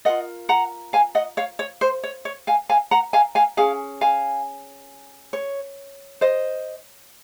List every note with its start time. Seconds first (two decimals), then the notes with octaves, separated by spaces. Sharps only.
0.05 F4 A#4 D#5 F#5
0.49 F#5 A#5
0.93 F5 G#5
1.15 D#5 F#5
1.37 C#5 F5
1.59 C#5
1.81 C5
2.03 C#5
2.25 C#5
2.47 F5 G#5
2.69 F5 G#5
2.91 F#5 A#5
3.13 F5 G#5
3.35 F5 G#5
3.57 C#4 G#4 F5 G#5
4.01 F5 G#5
5.33 C#5
6.21 C5 D#5